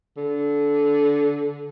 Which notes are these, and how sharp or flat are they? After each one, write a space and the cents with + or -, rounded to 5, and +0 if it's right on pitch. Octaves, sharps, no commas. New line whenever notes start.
D3 -20